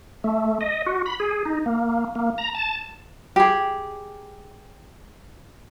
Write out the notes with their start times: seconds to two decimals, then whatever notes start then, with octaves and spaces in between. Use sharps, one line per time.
0.24 A3
0.61 D#5
0.86 F#4
1.06 B5
1.20 G#4
1.45 D#4
1.66 A#3
2.15 A#3
2.38 A#5
2.55 A5
3.36 G4 G#4